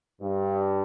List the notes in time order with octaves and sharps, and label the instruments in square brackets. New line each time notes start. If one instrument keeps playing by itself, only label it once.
[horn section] G2